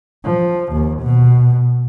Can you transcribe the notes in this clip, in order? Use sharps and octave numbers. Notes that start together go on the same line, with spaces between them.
F3
D#2
B2